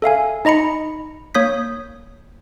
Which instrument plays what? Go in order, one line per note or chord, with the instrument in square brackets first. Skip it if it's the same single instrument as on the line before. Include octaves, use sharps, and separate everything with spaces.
[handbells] A4 E5 F5 G#5
D#4 D#5 A#5 B5 C#7
A#3 C#5 D#6 G6 B6